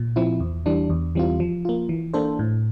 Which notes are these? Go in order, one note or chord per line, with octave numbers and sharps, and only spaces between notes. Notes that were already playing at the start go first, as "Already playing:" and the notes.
Already playing: A#2
F3 C4 E4
E2
E3 G3 D4
E2
E3 G3 C4 F4
F3
A#3 F4
E3
A#3 D4 A4 C5
A2